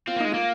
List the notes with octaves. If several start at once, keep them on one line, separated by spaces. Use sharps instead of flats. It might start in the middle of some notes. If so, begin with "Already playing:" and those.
C4 F4
A#3
G#3 D#4
A#3 F4